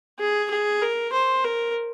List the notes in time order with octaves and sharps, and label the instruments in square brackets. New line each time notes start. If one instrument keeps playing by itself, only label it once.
[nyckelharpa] G#4
G#4
A#4
C5
A#4